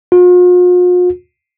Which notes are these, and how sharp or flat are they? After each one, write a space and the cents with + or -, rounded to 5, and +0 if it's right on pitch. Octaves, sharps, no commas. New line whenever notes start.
F4 +45